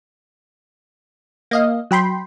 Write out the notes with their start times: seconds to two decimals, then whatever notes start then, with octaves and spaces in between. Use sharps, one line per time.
1.51 A#3 D#5 F5
1.91 F#3 G5 B5 C6